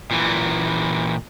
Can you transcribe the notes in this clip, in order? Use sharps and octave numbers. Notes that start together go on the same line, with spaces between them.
A#2 E3